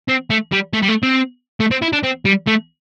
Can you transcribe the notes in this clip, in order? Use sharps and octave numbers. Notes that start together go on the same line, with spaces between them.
C4
A3
G3
A3
G3
A3
C4
A3
C4
E4
D4
C4
G3
A3